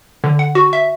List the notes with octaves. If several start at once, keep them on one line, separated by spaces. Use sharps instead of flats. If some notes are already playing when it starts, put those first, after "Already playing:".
D3
F#5
F#4
E5